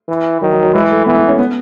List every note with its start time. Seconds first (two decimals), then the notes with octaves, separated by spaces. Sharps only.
0.08 E3
0.41 D#3 F#3
0.53 F#3
0.63 F#3
0.73 E3 G#3
0.90 A3
1.06 E3 B3
1.18 B3
1.28 C#4
1.39 B3